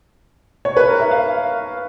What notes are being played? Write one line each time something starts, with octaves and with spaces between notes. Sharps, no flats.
C#5
B4
A#4
E5
F5